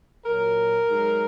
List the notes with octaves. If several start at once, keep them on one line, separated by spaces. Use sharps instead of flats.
A#2 F#3 A#4
G#2 F#3